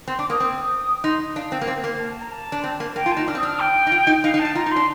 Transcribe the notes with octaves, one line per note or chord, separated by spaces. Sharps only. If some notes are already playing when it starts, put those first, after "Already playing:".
C4 C6
D4 D6
A#3 D#6
C4
D#4 C6
D4 F5
C4
A#3
C4
A#3
A5
A5
A#5
A5
D4
C4
A#3
A#3 G5
F4
A5
D#4
D4 F6
C4
D#6
D4 F6
G5
D#4
F4
D#4
D#4 F5
D#4
A5
D#4
F4 A#5
D#4
C6
D4